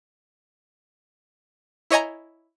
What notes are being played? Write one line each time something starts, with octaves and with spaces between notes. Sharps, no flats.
E4 C#5 D#5 G#5 A#5